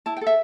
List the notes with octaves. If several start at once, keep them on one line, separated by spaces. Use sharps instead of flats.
E4 A5
G5
A4
E5